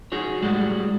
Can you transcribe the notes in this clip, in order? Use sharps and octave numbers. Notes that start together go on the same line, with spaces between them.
D#4 F#4 G#4 C#5
A2 G3 G#3 F#4